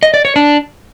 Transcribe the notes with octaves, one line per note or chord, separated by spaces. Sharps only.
D#5
D5
C#5
D4